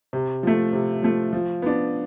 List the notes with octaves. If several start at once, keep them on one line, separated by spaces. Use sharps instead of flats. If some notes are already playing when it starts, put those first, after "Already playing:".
C3
F3 A3
C3
F3 A3
F3
B3 D4